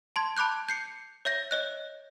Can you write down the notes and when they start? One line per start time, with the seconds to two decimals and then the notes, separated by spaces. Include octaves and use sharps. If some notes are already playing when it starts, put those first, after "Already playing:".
0.16 A5 C6 G#6
0.37 A5 B5 D6 F#6 G6
0.69 G6 C7 C#7
1.25 C#5 E5 G6 A#6
1.51 C#5 D#5 F#6